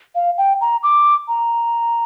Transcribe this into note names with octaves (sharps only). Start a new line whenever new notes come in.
F5
G5
A#5
D6
A#5